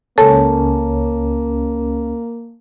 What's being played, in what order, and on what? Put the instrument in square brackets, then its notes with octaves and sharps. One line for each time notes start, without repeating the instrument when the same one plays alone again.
[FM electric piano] C#2 C#4 [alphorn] A#3 [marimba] A4 [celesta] A5